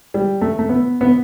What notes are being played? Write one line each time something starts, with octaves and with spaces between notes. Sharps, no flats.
G3
A3
A3
B3
B3